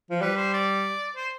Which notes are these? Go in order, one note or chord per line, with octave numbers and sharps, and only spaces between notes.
F3
G3 B4
C5
D5
C5